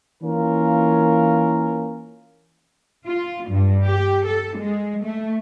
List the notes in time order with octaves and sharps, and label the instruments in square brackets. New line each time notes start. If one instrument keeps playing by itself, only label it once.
[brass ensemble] E3 A#3 C#4 F4 A#4
[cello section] F4
G2
G4
A4
G#3
A3